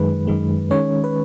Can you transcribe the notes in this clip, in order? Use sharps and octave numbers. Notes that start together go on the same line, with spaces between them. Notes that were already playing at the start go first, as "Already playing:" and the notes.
Already playing: F#2 D#3 G#3 B4
F#2 D#3 G#3
D#3 G#3 C#4 C#5
B4